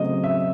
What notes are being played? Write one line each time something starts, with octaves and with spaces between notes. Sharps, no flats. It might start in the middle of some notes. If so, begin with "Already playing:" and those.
Already playing: C#3 F#3 A3 C4 D#5
E5